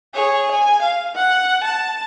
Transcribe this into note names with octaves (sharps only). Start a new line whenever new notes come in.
G#4 C#5
G#5
F5
F#5
A5